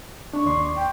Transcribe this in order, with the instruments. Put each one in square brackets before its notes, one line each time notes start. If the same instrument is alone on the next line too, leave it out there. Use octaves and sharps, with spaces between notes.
[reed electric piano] D4 [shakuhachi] C#6
[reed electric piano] D#2 D5 C6
[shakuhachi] G5